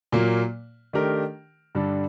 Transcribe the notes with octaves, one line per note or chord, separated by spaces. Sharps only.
A#2 F#3 A#3
D#3 A3 D4 G4 A#4
G2 D3 G3 D4 A4